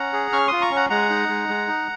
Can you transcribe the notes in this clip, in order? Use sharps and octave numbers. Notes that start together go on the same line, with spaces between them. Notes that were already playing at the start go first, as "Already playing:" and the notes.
Already playing: C#4 F#5 A#5
G#4
C#4 C#6 F6
F4 C6 D#6
A#5 C#6
C#4
F#5 A#5
G#3 F#5 A#5
D#4
G#3
G#3
D#4